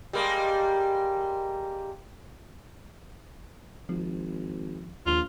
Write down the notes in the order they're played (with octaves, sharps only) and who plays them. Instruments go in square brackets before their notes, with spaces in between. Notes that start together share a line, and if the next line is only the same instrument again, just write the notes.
[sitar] G3 G#3 A#3
[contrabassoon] G#1 [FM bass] F3
[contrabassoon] A#1 [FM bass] D#2 [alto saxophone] F4